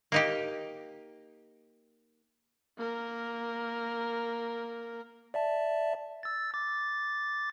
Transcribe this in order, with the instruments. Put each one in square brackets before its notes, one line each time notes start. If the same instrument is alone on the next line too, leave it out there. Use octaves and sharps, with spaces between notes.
[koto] A#3 D#4 G4
[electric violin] A#3 A#4
[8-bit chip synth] D5 E5 A5
E6 A6
D6 A6